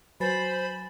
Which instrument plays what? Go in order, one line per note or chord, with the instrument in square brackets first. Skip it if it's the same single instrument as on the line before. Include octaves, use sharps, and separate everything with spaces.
[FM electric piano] F#3 [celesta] B4 G#5 A6 [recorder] C5 [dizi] B5